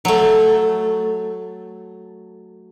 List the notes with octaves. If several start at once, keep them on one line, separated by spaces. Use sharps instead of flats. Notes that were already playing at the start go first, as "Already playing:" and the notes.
F#3 A3